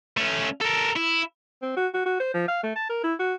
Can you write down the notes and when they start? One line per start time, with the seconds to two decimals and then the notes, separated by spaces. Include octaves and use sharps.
0.17 A3 C#4
0.61 A4 A#4
0.96 E4
1.62 C4
1.77 F#4
1.94 F#4
2.06 F#4
2.20 C5
2.34 F3
2.48 F5
2.64 A3
2.76 A5
2.90 A#4
3.04 E4
3.19 F#4